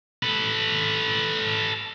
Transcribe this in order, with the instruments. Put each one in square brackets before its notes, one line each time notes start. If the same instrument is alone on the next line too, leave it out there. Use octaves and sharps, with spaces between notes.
[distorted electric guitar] A4 B4